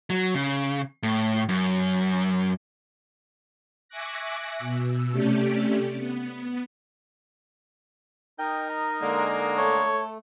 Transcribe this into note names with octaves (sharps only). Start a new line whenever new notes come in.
F#3
C#3
A2
F#2
E5 G#5 C#6 D6 F#6 A#6
B2 E6
C3 A3 C#4 G4 D5
B3
D#4 A#4 D#5 G5
A#5
D3 G#3 A#3
A3 A4 C#5